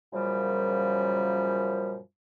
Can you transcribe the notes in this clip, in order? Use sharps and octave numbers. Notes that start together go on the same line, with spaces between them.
F#2 A#2 C#3 F3 G3